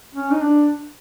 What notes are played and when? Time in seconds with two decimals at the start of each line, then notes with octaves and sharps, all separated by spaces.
0.15 C#4
0.32 D#4
0.41 D4